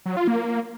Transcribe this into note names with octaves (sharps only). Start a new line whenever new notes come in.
F#3
F4
A#3